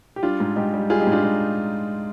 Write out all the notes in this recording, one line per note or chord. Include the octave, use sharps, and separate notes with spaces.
G4
G3 D4 F4
G#2
G#2 D#4 G4
G3
G3 F4 G#4
D#4 G4
G#2
D4 F4
G#2 D#4